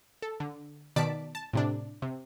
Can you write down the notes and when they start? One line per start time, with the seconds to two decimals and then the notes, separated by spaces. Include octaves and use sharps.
0.22 A4
0.40 D3
0.96 B2 D#3 D5 A5 B6 D7
1.35 A5
1.53 A2 C3 D4
2.02 C3